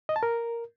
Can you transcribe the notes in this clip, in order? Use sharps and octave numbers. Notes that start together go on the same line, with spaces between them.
D#5
A5
A#4